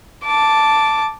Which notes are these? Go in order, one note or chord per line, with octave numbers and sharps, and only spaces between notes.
A5 D6